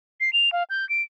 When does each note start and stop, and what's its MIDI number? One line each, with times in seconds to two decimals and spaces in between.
0.20 0.33 96
0.33 0.52 101
0.52 0.63 77
0.70 0.88 91
0.89 1.02 98